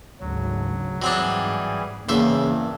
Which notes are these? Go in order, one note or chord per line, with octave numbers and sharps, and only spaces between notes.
G#1 D2 C#3 F#3
G#2 E3 F#3 G3 C4 D4 G#4
E2 G2 C#3 E3 A#3 C5 E5